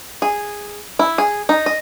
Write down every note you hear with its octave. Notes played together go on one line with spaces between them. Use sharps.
G#4
E4
G#4
D#4
D#5